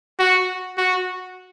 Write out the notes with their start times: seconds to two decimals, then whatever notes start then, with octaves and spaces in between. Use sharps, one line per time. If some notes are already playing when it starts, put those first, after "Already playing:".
0.19 F#4
0.78 F#4